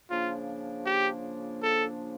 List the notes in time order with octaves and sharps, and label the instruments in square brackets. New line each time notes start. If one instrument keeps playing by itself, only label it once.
[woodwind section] C#3 F3 A#3 D4 [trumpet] F4
[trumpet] G4
A4